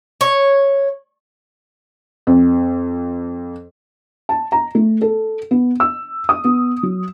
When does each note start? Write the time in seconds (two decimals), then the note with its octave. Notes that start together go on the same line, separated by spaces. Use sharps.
0.21 C#5
2.27 F2
4.29 A5
4.52 A#5
4.75 A3
5.02 A4
5.51 B3
5.80 E6
6.29 D#6
6.44 B3
6.83 F#3